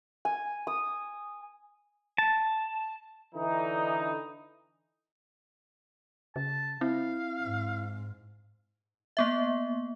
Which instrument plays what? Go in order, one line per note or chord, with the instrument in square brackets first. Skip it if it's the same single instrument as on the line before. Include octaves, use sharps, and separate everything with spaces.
[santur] G#5
D#6
[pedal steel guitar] A5
[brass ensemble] D3 E3 D#4
[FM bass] C#3 [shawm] A5
[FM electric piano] C4 [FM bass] E4 [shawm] F5
[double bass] G#2
[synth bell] A#3 B3 E5